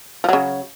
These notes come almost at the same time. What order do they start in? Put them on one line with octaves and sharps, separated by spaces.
F3 F#3 C#3